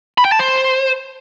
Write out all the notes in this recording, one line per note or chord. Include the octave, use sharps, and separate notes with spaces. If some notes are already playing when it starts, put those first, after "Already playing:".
B5
G5
A5
C5